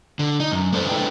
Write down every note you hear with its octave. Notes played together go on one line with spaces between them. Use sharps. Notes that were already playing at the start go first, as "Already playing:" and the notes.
D3
D#4
F#2
G#3 B3 D4 A4 C5
G#3 D4 E4 A4 B4 G5